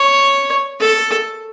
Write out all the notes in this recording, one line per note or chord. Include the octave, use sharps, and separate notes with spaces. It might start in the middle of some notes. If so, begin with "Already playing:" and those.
Already playing: C#5
A4